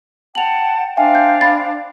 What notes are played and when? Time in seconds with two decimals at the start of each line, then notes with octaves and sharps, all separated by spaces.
0.35 F#5 G5 A5 F7 F#7
0.97 D4 C5 E5 F5 G5 G#5
1.15 G6
1.41 B5 A6